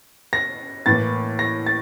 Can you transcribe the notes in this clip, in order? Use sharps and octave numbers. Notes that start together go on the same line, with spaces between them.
A#6
A2 E3 A#3 A6
A#6
A6